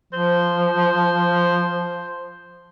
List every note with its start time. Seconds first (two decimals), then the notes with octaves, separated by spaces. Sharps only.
0.13 F3 C5